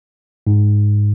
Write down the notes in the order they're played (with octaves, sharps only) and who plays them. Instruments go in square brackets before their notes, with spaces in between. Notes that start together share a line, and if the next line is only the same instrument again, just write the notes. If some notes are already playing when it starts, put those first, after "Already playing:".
[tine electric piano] G#2